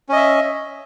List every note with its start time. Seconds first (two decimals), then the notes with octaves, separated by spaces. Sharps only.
0.09 C#4
0.13 D#5
0.16 E5